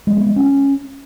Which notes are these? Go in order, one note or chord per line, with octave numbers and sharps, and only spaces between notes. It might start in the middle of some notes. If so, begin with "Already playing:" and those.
G#3
B3
G#3
C#4